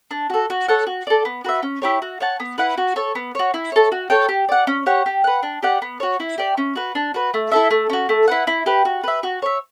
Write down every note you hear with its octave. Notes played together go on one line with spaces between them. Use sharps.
D4
F#4 A4
F#4
A4 C#5 F#5
F#4
A4 D5
B3
F#4 B4 E5
C#4
E4 G4 C#5
F#4
C#5 F#5 A5
B3
E4 B4 F#5
F#4
A4 C#5
B3
F#4 C#5
E4
A4 C#5
F#4
A4 C#5 G5
G4
D5 F#5
C#4
G4 C#5 F#5
G4
B4 F#5
D4
G4 D5 F#5
B3
F#4 C#5
E4
G4 D5
C#4
F#4 B4
D4
F#4 B4
A3
E4 A4 E5
A3
C#4 F#4
A3
E4 B4 F#5
E4
G4 B4
F#4
B4 E5
F#4
C#5 E5